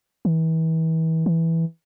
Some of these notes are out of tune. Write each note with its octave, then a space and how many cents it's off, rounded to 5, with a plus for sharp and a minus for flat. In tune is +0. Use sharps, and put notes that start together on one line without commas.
E3 -35
E3 -5